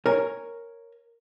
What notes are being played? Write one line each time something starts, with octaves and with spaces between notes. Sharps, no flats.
A#4 C#5 G#5